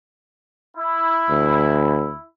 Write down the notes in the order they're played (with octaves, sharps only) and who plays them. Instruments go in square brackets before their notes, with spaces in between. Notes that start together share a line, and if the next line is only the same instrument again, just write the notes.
[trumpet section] E4
[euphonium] D2